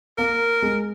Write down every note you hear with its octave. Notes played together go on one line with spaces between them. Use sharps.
A#3 A#4
G#3